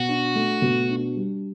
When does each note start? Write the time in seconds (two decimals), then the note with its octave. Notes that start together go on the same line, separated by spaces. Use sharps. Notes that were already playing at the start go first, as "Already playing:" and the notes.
Already playing: B2 F#4
0.09 D4
0.35 A3
0.62 B2
0.89 D4
1.16 G3